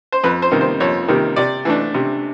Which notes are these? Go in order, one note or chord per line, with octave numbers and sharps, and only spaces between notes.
C5
F2 B4
C5
C3 D#3 G3 A#3
C5
F2 C#5
C3 D#3 G3 A#3
C3 D5
E3 A3 D4
C3